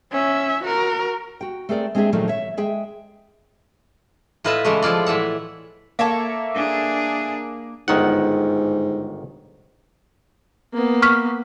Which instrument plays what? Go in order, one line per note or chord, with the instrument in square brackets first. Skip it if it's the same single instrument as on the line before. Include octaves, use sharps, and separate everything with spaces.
[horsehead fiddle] C#4 E5
F#4 A#4
[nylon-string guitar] F#4 G5
A3 C4 G#4 A#4 D5
G#3 C4 D4 F#4 G#4 E5
A#2 D#3 F3 F#3 A3
C#5 E5
G#3 G#4 E5 G5
[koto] A2 F4 B4 D#5 E5 A5
C#3 E3 G#3 A3
F3 E4 F4 D5
A2 E3 E5 F#5
[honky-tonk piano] A#3 [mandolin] A4 C#5 E5
[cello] D4 G#4
[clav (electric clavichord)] G1 D#3 F#5 [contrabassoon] G#2
[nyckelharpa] A#3 B3
[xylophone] C#6 F6 B6